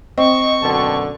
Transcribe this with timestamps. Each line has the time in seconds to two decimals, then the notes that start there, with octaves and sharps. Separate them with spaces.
0.18 C4 D#5 C#6
0.62 F#2 B2 D3 A5